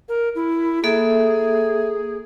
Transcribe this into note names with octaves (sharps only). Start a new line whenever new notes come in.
A#4
E4
A#3 G#4 A4 E5